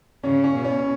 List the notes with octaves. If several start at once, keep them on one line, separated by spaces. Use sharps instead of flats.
C#3 C#4
C#4
B2
C#4